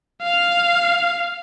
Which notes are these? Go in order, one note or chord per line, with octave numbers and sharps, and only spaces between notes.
F5